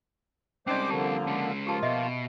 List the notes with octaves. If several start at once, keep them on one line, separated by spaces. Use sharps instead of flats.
G3 G#3 C4 C#4 D#4 C5 D5 D6
D3 F3 A#3 G4 A5
G#3 C#4
F3 A#3 F4 G4 A5
B2 D#5 E5